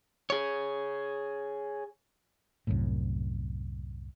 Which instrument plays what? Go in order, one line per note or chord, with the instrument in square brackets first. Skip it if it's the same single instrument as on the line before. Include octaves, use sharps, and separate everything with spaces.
[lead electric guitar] G#4 C#5
[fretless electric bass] C2 F#2 A2